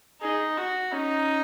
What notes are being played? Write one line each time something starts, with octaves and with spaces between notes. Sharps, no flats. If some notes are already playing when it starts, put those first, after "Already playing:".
D#4 G#4
F#4
C#4 D#4